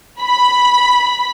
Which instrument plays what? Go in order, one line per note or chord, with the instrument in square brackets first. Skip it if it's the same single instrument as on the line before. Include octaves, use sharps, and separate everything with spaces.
[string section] B5